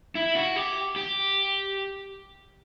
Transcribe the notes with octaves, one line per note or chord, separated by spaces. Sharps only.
E4
F#4
G4
G4